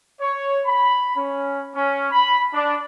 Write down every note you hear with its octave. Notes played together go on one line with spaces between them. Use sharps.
C#5
B5
C#4
C#4
B5
D4